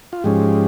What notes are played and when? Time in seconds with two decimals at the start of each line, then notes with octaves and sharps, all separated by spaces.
0.13 F4
0.24 G#2 F3 G#3 C#4 G4